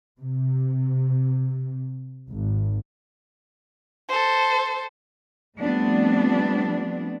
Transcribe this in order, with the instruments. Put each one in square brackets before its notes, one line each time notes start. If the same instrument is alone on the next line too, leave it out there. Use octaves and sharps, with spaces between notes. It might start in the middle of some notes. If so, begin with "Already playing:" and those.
[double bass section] C3
G#1
[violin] A4 C5
[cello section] F3 G3 A3 B3 C4 D4